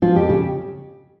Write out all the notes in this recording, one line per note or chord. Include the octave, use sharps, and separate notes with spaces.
F3 F4
F2 G4
C#3 G4